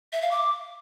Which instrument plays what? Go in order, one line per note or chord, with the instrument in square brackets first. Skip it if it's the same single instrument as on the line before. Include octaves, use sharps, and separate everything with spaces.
[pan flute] E5
F5
D6